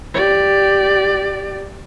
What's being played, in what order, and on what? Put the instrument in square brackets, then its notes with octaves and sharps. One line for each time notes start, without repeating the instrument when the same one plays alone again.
[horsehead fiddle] G4 D5